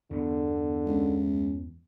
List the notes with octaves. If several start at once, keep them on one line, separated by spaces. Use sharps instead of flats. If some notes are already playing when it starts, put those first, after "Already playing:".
E2 G2 D3 B3
C#2